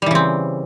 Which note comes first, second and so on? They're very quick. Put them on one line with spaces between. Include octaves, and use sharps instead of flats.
G3 E3 C#3 C4